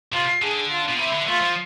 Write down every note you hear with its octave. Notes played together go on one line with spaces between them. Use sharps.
C3 F4
D3 G#4
F4
B2
C3 E4
D3
A3 F4
F3